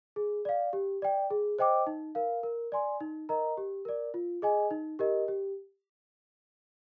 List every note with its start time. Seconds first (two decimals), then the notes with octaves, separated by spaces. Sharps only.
0.16 G#4
0.45 D5 F5
0.73 G4
1.02 D5 G5
1.31 G#4
1.59 C5 D#5 G5 D6
1.87 D#4
2.15 A#4 F5
2.43 A#4
2.72 D5 G#5 C6
3.00 D#4
3.29 A#4 D#5 A#5
3.57 G4
3.85 A#4 D5
4.14 F4
4.42 G#4 D#5 G#5
4.71 D#4
4.99 G4 A#4 D#5
5.28 G4